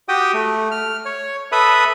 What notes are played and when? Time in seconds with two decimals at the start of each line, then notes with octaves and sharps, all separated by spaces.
0.08 F#4 G4 G5 D#6
0.34 A3
0.71 F6
1.05 C#5
1.52 A4 B4 E5 B5 D#6